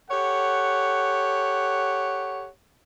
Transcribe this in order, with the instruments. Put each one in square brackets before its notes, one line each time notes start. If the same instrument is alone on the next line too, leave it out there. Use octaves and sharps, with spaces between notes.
[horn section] G4 A4 C#5 F#5